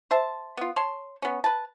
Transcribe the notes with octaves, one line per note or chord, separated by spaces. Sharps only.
C5 E5 A5
B3 F4
C#5 A5 C6
B3 C#4
B4 A5